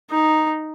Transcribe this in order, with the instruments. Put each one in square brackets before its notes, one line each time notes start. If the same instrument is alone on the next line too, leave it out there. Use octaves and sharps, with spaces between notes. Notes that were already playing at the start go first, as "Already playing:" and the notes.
[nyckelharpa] D#4